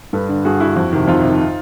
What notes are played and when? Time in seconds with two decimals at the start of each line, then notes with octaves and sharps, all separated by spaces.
0.13 G2 A4 B4
0.29 D3
0.45 G2 F#4 G#4
0.60 D3 E4 F#4
0.76 F2
0.93 C3 D#3
1.08 F2 D#4 F4
1.23 C3
1.29 D#3